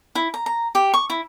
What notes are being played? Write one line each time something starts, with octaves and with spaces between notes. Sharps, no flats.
E4
A#5
A#5
G4
C#6
E4